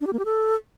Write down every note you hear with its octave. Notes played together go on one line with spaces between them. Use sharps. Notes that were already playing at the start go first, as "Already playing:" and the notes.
D4
G4
A#3
G4
A4